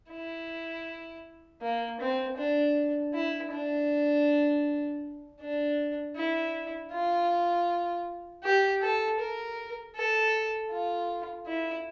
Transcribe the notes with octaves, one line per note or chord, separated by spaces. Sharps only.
E4
A#3
C4
D4
E4
D4
D4
E4
F4
G4
A4
A#4
A4
F4
E4